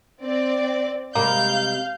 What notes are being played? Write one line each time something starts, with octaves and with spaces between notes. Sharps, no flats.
C4 D5
C3 G3 G#3 A#3 F5 G6